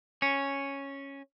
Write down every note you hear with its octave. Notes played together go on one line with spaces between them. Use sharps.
C#4